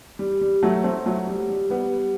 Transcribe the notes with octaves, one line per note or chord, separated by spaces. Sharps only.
G3
G3
F#3 A3
A3 C4
F#3 A3
G3
G3
G3 B3